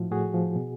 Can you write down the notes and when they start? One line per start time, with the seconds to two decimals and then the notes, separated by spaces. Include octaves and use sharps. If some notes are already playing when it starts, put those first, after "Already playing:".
Already playing: A2 F3 E4 F#4
0.11 A2 F#4 G#4
0.34 F3
0.56 B2